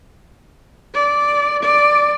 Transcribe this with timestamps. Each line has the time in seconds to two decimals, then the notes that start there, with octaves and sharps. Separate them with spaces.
0.94 D5
1.63 D5